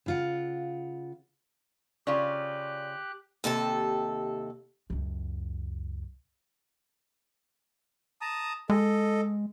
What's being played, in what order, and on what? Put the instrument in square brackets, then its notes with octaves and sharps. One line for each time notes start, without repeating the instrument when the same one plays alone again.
[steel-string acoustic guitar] C#3 F4 F#5
[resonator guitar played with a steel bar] C#3 F4 [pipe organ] G4 F#6 [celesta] D5
[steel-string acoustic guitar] D#2 C3 A4 A5
[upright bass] C#2 F#2
[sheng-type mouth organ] A5 A#5 D#6
[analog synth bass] G#3 [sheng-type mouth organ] A4 D#5